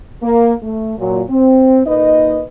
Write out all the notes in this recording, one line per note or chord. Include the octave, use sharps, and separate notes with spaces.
A#3
A3
A#2 F#3
C4
A#2 A#3 D#4 B4 D#5